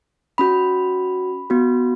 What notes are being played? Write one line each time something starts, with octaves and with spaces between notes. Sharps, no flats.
C#4 F#4 B5
B3 F#4